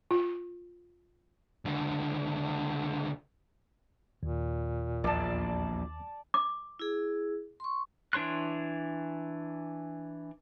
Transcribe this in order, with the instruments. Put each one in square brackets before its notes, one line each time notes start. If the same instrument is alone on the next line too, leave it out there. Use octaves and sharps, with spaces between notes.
[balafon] F4
[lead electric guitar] C#2 D3
[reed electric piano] D#2 [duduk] A#2
[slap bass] A#1 E2 [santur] D5 A5
[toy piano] D6
[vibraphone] E4 G#4
C6 C#6
[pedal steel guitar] E3 D4 C#5 C6 F#6